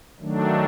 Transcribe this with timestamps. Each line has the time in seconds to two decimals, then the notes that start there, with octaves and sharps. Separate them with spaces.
0.19 D#3 F#3 A3 D4